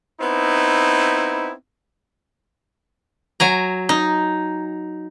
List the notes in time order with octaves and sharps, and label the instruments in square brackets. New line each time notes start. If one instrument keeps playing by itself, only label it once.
[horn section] B3 C4 D#4 E4
[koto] F#3 G#5 A#5
D#4